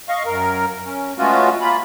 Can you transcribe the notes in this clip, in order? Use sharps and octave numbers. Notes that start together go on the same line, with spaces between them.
D#5 F5 C#6
F#2 A#4
C#4
G#3 A3 B3 C#4 F4 F#4
A#3 F4 B5